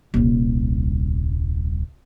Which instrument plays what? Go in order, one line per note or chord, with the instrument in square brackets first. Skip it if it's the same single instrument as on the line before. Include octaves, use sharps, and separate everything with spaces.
[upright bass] D#1 C2